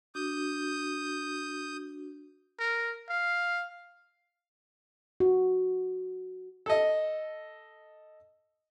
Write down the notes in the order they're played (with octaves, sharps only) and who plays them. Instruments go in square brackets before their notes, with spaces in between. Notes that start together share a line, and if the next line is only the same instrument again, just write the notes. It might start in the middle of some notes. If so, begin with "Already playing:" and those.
[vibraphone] D4 F#4 [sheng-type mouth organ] D#6 G6
[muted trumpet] A#4
F5
[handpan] F#4
[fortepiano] A4 D#5